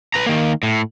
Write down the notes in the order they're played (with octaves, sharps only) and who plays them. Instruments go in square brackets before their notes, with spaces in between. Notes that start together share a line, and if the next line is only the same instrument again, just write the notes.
[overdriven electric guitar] B4 A#5
D#3 A#3
A2